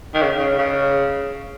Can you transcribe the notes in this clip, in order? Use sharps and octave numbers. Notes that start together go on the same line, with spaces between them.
D#3
C#3
C#3
C#3